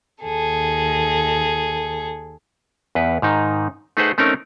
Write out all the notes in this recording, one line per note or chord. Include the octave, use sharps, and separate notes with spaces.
D#2 G#4 A4
E2 B4
G#2 D#3 D#4
A3 D#4 G#4 B4 C5 F#5
A3 C4 C#4 D#4 A#4